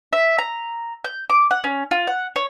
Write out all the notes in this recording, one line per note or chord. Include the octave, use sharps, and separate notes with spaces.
E5
A#5
G6
D6
F#5
C#4
F4
F#5
C#5